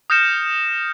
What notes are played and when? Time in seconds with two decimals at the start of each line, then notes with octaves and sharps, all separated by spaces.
0.10 D#6 F6 G6 A#6 C#7 E7